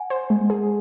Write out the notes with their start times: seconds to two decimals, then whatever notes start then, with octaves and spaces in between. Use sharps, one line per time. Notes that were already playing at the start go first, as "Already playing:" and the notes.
Already playing: F#5 G#5
0.10 C5
0.30 G#3
0.50 G#4